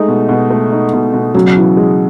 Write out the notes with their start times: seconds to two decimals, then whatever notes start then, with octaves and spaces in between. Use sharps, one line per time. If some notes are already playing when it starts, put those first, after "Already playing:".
Already playing: G#3 A3 D#4
0.08 B2
0.29 B2
0.50 A3
0.72 D#4
0.93 B2
1.13 B2
1.34 C#3 F#3
1.57 E3
1.77 G#3